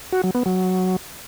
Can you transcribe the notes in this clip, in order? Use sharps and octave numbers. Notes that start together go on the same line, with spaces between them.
F#4
F#3
B3
F#3